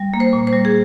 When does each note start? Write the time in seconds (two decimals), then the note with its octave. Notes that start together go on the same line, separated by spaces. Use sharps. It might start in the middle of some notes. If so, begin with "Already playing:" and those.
Already playing: G3
0.14 A#3
0.20 C5
0.33 A#2
0.47 C5
0.53 G3
0.65 G#4